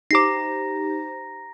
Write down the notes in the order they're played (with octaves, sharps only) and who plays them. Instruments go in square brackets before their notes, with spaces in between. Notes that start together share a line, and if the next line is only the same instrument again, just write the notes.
[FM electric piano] D#4 G4 C5 [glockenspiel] A#5 A#6 [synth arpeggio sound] D6 C7